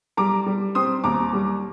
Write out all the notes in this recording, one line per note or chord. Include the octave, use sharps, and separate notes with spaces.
G3 A#5 D6
G3
C4 C6 D#6
D#2 A#5 D6
G3